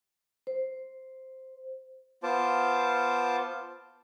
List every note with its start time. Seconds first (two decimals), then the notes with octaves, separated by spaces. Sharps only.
0.47 C5
2.23 B3 F4 C5 A5 D6